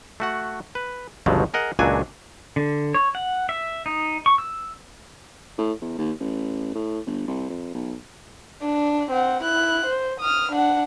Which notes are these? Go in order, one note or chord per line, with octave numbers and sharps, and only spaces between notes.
A3 F#4 F#5
B4
G1 C#2 B2 F3 F#3
G#4 A#4 D#5 F#5
C#2 A#2 F#3 D4 F#4 G#5
D3
C#5
F#5
E5
D#4
C#6
E6
A2
E2
D#2
A1
A2
G1
C2
F2
B1
D4
C4 F#5
E4 F#6
C5
D#6 F6
D4 F#5